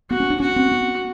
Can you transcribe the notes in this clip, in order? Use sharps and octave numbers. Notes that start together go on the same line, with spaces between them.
B3 F#4
C#4
D4
C#4 F#4
C4
B3